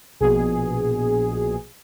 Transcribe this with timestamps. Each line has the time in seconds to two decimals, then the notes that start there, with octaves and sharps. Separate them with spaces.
0.20 A#1 B2 G#4